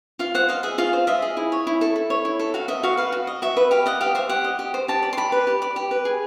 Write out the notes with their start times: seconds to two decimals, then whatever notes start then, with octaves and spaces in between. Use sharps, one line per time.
0.19 F4 F5
0.34 C5 F#5
0.48 D#5 F5
0.63 G#4 E5
0.78 F4 F5
0.93 C5
1.07 D#5 E5
1.22 G#4
1.37 E4
1.52 C#5
1.67 E4
1.81 A4
1.96 E4
2.10 C#5
2.25 E4
2.39 A4
2.54 F#4 F5
2.68 D#5 E5
2.83 F#4 F5
2.97 B4 F5
3.12 F#4
3.27 D#5
3.42 F#4 E5
3.57 B4
3.71 G4 F5
3.86 D#5 F#5
4.01 G4 F5
4.15 C5 E5
4.29 G4 F#5
4.44 D#5
4.59 G4
4.74 C5
4.88 G4 A5
5.03 D5
5.13 C6
5.17 G4 B5
5.32 B4
5.47 G4
5.62 D5
5.76 G4
5.91 B4
6.05 G#4